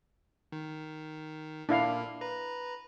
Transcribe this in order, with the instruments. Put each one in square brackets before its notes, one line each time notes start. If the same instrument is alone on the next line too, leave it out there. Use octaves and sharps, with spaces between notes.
[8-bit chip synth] D#3
[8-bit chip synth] A#2 A#3 [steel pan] D4 E4 F5
[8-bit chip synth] B4 A#5